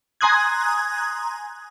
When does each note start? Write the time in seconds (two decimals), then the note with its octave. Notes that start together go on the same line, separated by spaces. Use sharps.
0.21 G#5 A#5 C6 D#6 F#6 G#6